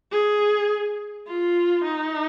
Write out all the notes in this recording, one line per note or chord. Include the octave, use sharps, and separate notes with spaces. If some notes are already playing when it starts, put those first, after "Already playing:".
G#4
F4
D#4